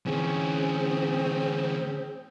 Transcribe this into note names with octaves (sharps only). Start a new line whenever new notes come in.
D2 E3 C4 C#4 G#4